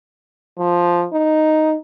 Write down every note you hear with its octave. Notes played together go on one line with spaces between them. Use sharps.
F3
D#4